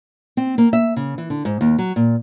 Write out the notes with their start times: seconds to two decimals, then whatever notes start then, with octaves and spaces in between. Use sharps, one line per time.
0.37 C4
0.58 A#3
0.73 E5
0.96 C#3
1.18 E3
1.30 D3
1.45 G#2
1.61 D#2
1.78 F#3
1.96 A#2